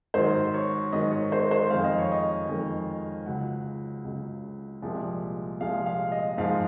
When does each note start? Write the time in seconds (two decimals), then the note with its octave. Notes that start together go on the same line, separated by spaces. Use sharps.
0.14 G#2 D#3 F#3 C5
0.54 C#5
0.92 G#2 D#3 F#3 D#5
1.12 C#5
1.32 C5
1.51 C5
1.70 F2 D#3 G#3 F5
1.85 D#5
1.99 C#5
2.12 D#5
2.49 F2 D#3 G#3
3.26 C#2 C#3 F#3 F#5
4.04 C#2 C#3 F#3
4.82 C2 A#2 F3 G#3
5.60 C2 A#2 F3 G#3 F5
5.86 F5
6.12 D#5
6.38 G#2 F3 G#3 F5